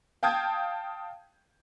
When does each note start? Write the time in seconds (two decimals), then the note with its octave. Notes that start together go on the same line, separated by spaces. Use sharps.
0.23 F5 G5 A5 D#6 G6 G#6